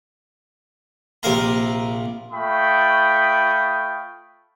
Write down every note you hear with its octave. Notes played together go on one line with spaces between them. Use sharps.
A#1 C3 A#4 F5 A#5
A3 F4 G5 B5 C#6 D#6